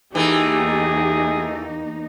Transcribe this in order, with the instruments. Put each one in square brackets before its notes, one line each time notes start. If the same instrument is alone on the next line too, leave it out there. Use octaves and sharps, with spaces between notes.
[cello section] E2 A#3 D#4 [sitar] E3 A3 [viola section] G4 [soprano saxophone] G#4